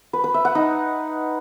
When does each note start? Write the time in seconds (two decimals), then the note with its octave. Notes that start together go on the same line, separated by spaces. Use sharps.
0.13 B4
0.24 B4
0.34 E5
0.45 F#5
0.55 D#4